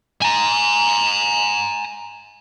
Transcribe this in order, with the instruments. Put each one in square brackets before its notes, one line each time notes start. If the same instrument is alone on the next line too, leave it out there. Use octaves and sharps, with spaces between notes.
[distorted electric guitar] G#5 A#5